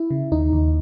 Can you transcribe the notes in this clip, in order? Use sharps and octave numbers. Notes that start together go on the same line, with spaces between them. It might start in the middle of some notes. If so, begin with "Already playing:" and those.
Already playing: E4
C#3
D#2 D#4
D#2